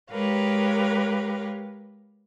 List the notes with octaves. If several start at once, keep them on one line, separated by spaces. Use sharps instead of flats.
G#3 G4 A#4 B4 C#5 F5